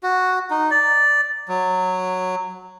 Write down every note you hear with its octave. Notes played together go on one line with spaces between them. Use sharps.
F#4
D#4
D5
F#3